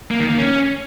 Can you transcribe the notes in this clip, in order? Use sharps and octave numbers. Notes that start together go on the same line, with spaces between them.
A#3
D#3
A#3
C#4